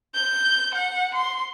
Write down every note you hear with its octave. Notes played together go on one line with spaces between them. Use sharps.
G6
F#5
C6